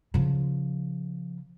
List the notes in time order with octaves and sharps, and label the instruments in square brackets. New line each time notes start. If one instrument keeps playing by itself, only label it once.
[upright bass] C#3 F3